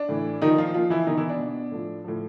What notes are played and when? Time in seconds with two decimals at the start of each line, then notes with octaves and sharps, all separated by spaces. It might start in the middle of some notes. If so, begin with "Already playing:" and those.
Already playing: D4
0.09 A2 E3
0.41 A#2 D#3 F3 D#4
0.58 F3 F4
0.74 A#2 F3 F4
0.90 E3 E4
1.07 B2 D#3 D#4
1.17 E3 E4
1.29 D4
1.39 B2
1.71 A2 F3
2.04 A2 F3